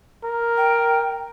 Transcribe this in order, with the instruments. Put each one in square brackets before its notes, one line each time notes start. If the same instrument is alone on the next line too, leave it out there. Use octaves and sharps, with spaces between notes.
[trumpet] A#4
[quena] G5